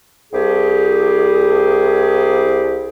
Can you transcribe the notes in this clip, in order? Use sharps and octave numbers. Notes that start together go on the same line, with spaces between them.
C2 G4 G#4